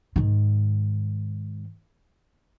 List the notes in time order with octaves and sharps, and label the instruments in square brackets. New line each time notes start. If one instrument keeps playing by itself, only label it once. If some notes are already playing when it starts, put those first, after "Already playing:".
[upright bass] G#2 D#3